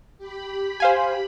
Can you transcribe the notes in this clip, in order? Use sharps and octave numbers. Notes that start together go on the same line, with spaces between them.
G4 B5
C5 F5 G#5